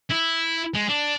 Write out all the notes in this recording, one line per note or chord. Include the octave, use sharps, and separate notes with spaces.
E4
G#3
D4